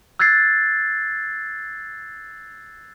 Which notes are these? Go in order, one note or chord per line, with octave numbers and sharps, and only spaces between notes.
E6 F#6 G#6 A6 C7